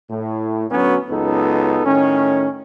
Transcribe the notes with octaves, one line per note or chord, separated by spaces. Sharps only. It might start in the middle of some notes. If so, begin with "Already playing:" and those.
A2
D2 F#3 B3 C#4
C#2 F#2 B3 D#4 A4
A2 D#3 C#4